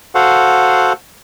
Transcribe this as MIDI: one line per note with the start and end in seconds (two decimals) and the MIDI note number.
0.15 0.93 66
0.15 0.93 69
0.15 0.93 72
0.15 0.93 77
0.15 0.93 78